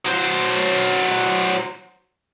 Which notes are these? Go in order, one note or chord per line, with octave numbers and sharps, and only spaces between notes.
F#3 C5